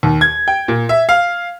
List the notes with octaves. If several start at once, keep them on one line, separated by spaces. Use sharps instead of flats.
D#2
G#6
G5
A#2
E5
F5